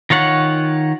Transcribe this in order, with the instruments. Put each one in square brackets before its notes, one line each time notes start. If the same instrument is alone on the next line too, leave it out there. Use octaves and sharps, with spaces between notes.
[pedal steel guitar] D#3 F4 C#5 F#5